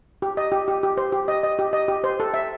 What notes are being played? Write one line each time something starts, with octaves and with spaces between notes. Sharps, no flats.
G4
D#5
G4
G4
G4
C5
G4
D#5
D#5
G4
D#5
G4
C5
A4
E5